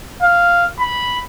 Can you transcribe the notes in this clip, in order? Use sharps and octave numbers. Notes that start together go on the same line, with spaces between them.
F5
B5